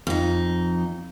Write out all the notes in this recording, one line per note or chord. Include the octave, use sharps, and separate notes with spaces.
F2 D#4